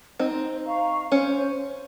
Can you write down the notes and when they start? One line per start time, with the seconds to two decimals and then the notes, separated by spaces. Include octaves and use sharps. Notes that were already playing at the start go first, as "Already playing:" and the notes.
0.19 C4 D#4 C5
0.65 F5 A#5 C#6
1.11 C#4 C5